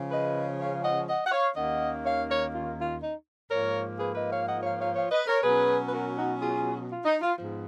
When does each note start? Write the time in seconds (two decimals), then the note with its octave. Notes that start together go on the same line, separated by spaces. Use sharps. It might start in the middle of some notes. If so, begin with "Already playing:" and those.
Already playing: C#3 F3 G#3 C#4
0.11 B4 D#5
0.60 C#5 F5
0.84 D#5 F#5
1.08 D#5 F#5
1.26 F#5
1.32 C#5 F5
1.56 D#2 D#3 A#3 C#4 D#5 F#5
2.05 C#5 F5
2.29 A#4 C#5
2.53 F4
2.78 F4
3.02 D#4
3.50 G#2 F3 A#3 A#4 C#5
3.98 G#4 B4
4.15 B4 D#5
4.31 C#5 F5
4.47 D#5 F#5
4.63 C#5 F5
4.79 C#5 F5
4.96 C#5 F5
5.11 B4 D#5
5.27 A#4 C#5
5.43 B2 F#3 C#4 G#4 B4
5.86 B4
5.92 F#4 A#4
6.16 D#4 F#4
6.41 F4 G#4
6.90 F4
7.05 D#4
7.21 F4
7.38 G#2 F3 B3